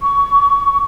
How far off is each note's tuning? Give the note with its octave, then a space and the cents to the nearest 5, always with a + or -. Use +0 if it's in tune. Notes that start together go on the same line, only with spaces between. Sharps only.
C#6 +25